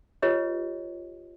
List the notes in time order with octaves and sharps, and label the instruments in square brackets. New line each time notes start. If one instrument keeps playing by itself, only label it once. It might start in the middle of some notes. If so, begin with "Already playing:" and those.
[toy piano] F4 G4 B4 C#5 D#5